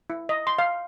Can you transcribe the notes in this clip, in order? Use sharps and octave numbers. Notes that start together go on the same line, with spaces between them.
E4
D#5
C6
F5